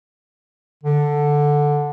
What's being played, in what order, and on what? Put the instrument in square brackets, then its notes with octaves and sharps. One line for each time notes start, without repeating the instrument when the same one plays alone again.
[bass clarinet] D3